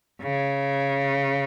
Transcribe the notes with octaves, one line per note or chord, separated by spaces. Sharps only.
C#3